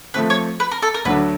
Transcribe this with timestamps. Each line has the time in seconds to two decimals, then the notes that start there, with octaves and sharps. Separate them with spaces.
0.14 F3 A3 C4 B4
0.30 C#5
0.60 B4
0.71 A#4
0.82 A4
0.94 A#4
1.05 D2 D3 F#3 A3 D4 B4